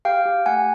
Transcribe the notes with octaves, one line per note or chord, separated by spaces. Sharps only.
G4 F5 G5
G4
A3 F#5 G#5